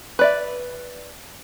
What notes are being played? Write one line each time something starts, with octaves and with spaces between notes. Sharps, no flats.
B4 D5 E5